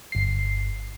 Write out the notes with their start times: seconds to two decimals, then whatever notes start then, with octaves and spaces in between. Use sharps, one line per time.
0.12 G1 C7